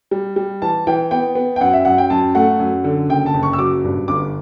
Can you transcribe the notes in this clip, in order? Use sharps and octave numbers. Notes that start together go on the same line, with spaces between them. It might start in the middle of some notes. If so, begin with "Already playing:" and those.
G3
G3
E3 A5
E3 G5
B3 G5
B3
G5
F#2 F#5
E5
F#2 F#5
G5
F#2 A5
A3 F#5
F#2
D3
F#1 G5
A5
F#1
C#6
E6
F#3 D6
G2
G1 D6